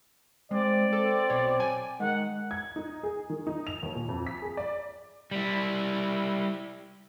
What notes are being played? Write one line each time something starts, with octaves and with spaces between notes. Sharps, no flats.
G#3 C4 D5
C4 A4
B1 C#5
G5 G#5
D#3 G#3 F#5
G#6
D#4
G#4
D#3
D#4
F7
D#2
A#2
F2
B6
G#4
D5
G3 E4